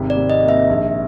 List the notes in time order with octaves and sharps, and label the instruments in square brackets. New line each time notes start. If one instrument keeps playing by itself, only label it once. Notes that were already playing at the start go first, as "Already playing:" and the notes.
Already playing: [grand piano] G#1 C3
[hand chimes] D5
[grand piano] C3
[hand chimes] D#5
[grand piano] A#3
[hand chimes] E5
[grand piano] A#1